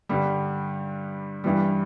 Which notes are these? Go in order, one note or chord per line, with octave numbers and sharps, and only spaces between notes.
G2 D3 G3
G2 E3 G3